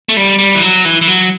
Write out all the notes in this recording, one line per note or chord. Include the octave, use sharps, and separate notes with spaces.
A3
G3
G3
E3
F#3
E3
E3
F#3